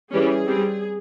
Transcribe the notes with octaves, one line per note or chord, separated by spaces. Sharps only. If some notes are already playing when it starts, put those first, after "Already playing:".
E3 G3 C#4 G#4
G3 C4